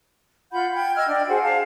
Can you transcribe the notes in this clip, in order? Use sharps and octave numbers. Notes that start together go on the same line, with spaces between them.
F4 F#5 B5 G6
G5 G6 G#6
D#5 E6 F6 G#6
D4 D5 G5
F#4 G#4 C5 F#5
F5 A5